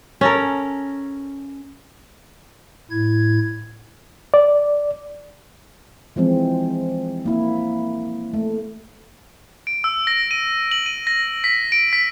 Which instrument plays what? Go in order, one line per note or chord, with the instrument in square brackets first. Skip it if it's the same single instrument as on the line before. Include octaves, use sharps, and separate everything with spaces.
[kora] C#4 A4 A#4
[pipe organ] A2 E4 G#6
[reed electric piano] D5
[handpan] E3 F3 G#3 C4
A#3 E4
A3
[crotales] D7
E6
A#6
D#7
F#7
D#7
A#6
B6
D7
B6